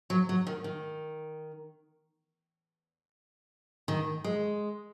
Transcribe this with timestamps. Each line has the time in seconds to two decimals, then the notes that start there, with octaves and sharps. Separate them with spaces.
0.10 F#3
0.29 F#3
0.47 D#3
0.64 D#3
3.88 D#3
4.24 G#3